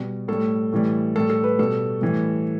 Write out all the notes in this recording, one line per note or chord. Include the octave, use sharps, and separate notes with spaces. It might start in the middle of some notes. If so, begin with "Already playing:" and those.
Already playing: B2 G3
A2 G3 A4
A2 E3 G3
A2 G3 A4
A4
B4
B2 G3 A4
A2 E3 G3